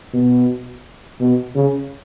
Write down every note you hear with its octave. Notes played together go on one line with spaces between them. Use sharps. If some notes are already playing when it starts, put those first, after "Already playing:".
B2
B2
C#3